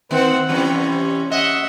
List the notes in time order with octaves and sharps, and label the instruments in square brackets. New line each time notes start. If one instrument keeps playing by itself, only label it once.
[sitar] D#3 [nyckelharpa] C4 F#5
[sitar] C3 E3 G3 [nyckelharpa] C#4
[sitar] D#5 [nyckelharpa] E5 F#5